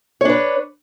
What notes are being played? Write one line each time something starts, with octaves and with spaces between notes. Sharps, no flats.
D4 B4 C#5